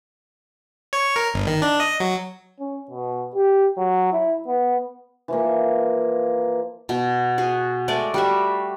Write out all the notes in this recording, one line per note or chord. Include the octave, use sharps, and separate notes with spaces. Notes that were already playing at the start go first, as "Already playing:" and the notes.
C#5
A#4
G1
D#3
D4
D#5
F#3
C#4
B2
G4
F#3
E4
B3
E3 F3 A#3
B2
F#4 G#4
G#3 A3 D5
G3 F#4 E5